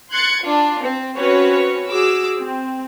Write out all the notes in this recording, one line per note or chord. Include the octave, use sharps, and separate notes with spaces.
C6 F#6 G#6 A6 C#7
D4 F4
C4
C4 C#4 F#4 B4 C#5
F#4 G#4 D6 E6
C4